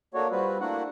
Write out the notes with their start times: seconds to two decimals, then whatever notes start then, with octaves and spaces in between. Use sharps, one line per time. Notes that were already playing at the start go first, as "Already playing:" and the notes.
0.14 A3 A#3 D4 F#4 C#5
0.31 G3 C4 F4 F#4 B4
0.60 A3 A#3 D4 E4 F#4 F#5